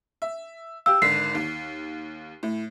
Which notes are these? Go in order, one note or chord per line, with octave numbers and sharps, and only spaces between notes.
E5
G4 F5 E6
G#1 D3 B6 C7
D#2
A2